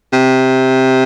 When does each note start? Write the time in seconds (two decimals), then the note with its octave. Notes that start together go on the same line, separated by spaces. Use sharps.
0.13 C3